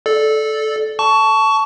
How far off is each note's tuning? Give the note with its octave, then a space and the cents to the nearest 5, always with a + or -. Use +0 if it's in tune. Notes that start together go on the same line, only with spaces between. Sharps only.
A4 -15 D5 +0
A5 +0 C#6 +20